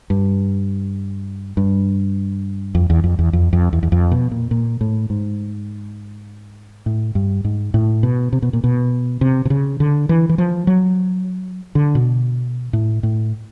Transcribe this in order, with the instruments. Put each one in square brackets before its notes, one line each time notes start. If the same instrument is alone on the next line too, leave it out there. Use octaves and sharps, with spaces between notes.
[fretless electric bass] G2
G2
F2
E2
F2
E2
F2
F2
E2
E2
F2
B2
A#2
A#2
A2
G#2
A2
G2
G#2
A2
B2
C3
B2
A#2
B2
C3
C3
C#3
D3
E3
E3
F3
F#3
D3
B2
A2
A2